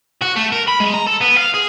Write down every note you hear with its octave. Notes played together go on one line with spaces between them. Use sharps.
F#4
A3
A#4
B5
G#3
A#5
A4
B3
F5
G#4